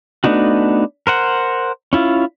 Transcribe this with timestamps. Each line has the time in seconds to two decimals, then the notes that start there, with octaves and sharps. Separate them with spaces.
0.24 A3 B3 D4 D#4 F#4
1.07 A#4 C5 F#5
1.93 C#4 E4 F4